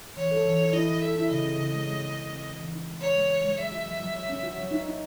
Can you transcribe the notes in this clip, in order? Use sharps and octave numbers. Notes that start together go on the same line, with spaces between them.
E3 C#5
A4
E3
A4
E4 D#5
E3
A4 E5
E4
C#3 D#5
C4
C#3
G#3
G#3
C#3
C#3
C4
E3
E3
D#4
G#3
G#3 C#5
G#3
E3
G#3
F#3 E5
F#4
F#3
F#3
F#3
C#4
F#4
F#3
D#4
D#4